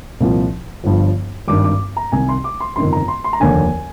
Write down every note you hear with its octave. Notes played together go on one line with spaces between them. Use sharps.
C2 A#2 F3
G1 G2 F3
G#1 G2 D#3 D6
D6
A#5
C2 C3 D#3 G#5
C6
D6
C6
G1 F2 C3 D#3 C6
A#5
C6
C6
A#5
F1 D#2 D3 G#5